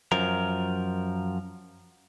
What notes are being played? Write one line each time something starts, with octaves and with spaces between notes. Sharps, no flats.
F#2 F3 A#4